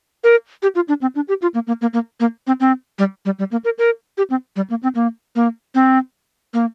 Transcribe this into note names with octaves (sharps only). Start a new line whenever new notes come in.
A#4
G4
F4
D4
C4
D4
G4
F4
A#3
A#3
A#3
A#3
A#3
C4
C4
G3
G3
G3
A#3
A#4
A#4
G4
C4
G3
A#3
C4
A#3
A#3
C4
A#3